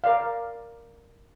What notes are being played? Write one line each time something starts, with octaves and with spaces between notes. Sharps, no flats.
A#4 D5 F5